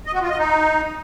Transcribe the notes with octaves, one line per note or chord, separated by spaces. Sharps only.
D#5
F#4
F4
D#5
D#4